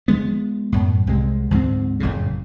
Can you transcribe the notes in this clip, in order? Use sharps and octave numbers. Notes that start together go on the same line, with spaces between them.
F3 G#3 B3
F#2 A2
C2 C3 G#3
D2 G#2 F3 C4
F#1 F2 A2 C#3